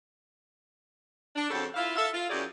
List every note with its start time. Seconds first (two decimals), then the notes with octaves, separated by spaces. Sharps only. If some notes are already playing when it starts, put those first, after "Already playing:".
1.36 D4
1.50 F2 C#3 F#4 G4 A4
1.75 E4 F4 F5
1.96 A4 E5 F5
2.13 F4
2.29 F#2 F#3 E4 G4 G#4 D5